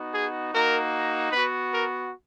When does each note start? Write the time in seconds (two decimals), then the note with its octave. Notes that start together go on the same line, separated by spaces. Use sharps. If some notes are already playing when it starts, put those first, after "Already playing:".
Already playing: B3 D#4 F#4
0.14 G#4
0.52 A#3 D#4 F#4 A#4
1.32 B3 F#4 B4
1.72 A#4